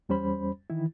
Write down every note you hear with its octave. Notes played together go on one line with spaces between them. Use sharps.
E2 G3 C#4 C5 B5
D#3 E3 E4